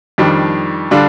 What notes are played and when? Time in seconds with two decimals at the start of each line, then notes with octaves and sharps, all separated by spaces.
0.18 F2 D#3 G3 D4
0.91 D3 G3 D4 F4